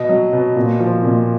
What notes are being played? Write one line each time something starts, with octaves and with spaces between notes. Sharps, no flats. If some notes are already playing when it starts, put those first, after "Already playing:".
Already playing: B2 D#5
F#3
B2
A#2
F3
A#2